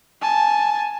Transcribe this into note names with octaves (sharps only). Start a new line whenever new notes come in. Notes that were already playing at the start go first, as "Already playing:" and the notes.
G#5 A5